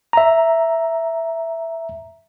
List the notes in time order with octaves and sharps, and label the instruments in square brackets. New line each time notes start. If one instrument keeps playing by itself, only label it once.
[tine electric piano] E5 A#5